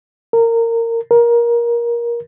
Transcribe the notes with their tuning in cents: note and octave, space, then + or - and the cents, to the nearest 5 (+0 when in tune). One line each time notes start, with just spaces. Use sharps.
A#4 -20
A#4 +20